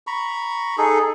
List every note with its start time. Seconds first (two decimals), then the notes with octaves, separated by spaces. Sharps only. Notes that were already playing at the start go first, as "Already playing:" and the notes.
0.07 A#5 B5 C#6
0.78 D#4 G#4 A4